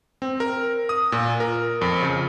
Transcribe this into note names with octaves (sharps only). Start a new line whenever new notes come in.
C4
A#4
D#6
A#2
A#4
F2
C#3